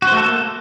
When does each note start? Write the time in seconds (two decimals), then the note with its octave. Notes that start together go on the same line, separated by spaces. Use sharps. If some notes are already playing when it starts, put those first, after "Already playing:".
0.02 F#4
0.07 C5
0.12 A3
0.17 A4
0.22 A#3